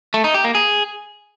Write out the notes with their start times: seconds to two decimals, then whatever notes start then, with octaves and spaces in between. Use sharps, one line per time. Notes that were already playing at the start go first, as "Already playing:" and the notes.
0.14 A3
0.24 D#4
0.34 G4
0.45 A#3
0.55 G#4